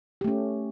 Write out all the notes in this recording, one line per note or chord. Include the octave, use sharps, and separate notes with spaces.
A3 C#4 G4